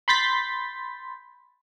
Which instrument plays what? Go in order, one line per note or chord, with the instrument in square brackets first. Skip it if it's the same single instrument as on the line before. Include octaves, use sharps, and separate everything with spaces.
[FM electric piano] B5 C6 G6 A6 B6